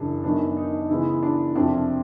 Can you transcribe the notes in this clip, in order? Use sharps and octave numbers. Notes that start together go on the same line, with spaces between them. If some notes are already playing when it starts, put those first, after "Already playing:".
Already playing: F#2 C#3 E3 D4
F#2 D#3 F#3 B3 D4
D#4
C#3 E3 G#3 B3 E4
D4
F2 C3 F3 D4